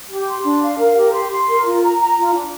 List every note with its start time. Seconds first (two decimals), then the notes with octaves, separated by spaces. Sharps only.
0.10 G4
0.28 C6
0.44 D4
0.62 F5
0.79 A#4
0.97 G4
1.13 C6
1.31 C6
1.48 A#4
1.66 F4
1.83 A#5
1.99 A#5
2.17 F4
2.34 D4